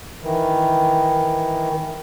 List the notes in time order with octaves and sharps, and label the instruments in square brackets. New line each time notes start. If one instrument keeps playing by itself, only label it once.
[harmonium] D#3 E3